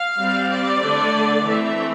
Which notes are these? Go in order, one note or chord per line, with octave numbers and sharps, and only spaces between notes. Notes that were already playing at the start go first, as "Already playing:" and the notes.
Already playing: F5
G3 C4
D5
D3 A3 D4
E3 A3 C4 E5